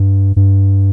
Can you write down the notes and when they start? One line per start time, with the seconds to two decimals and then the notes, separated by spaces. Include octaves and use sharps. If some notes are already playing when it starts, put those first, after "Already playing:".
Already playing: G2
0.36 G2